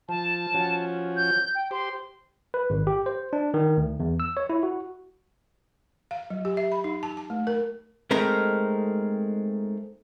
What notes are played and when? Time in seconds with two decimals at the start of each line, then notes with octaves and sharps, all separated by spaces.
0.09 F3 A5
0.54 F3 C#4 F#4
1.16 G6
1.55 G5
1.71 G4 C5 C6
2.54 B4
2.70 G#1
2.87 G4
3.06 C5
3.33 D4
3.54 D#3
3.77 D2
4.00 E2
4.20 E6
4.37 C#5
4.50 E4
4.63 F#4
6.11 F5
6.30 F#3
6.45 G4
6.57 E5
6.72 B5
6.84 D#4
7.03 A5
7.17 A5
7.30 A3
7.47 A#4
8.11 G#3 A3 C4 D#4 A#4